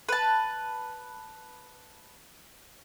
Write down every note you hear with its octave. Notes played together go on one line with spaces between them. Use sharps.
B4 A5